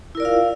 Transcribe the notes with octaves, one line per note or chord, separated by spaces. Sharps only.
E4 F4 A#4 D5 F5